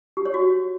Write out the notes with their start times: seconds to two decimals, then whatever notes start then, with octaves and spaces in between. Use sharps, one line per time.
0.17 G4
0.25 C#5
0.34 F#4